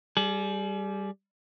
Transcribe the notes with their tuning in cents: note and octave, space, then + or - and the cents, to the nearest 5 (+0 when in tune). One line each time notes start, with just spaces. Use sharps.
G3 +0 G#4 +35